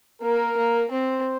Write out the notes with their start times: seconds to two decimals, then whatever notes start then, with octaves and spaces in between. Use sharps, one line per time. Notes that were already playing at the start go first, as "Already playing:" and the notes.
0.22 A#3 A#4
0.57 A#3
0.91 C4 C5